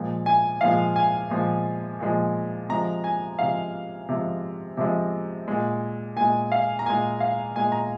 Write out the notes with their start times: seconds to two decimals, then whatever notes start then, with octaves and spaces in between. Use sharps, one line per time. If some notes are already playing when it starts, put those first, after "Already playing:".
Already playing: A#2 F3 G#3
0.26 G#5
0.61 A#2 F3 G#3 F5
0.96 G#5
1.30 A#2 F3 G#3
2.00 A#2 F3 G#3
2.69 C3 F3 G#3 A#5
3.04 G#5
3.39 C3 F3 G#3 F5
4.09 C3 F3 G#3
4.77 C3 F3 G#3
5.48 A#2 G#3
6.16 A#2 G#3 G#5
6.52 F5
6.79 A#5
6.86 A#2 G#3 G#5
7.20 F5
7.55 A#2 G#3 G#5
7.72 A#5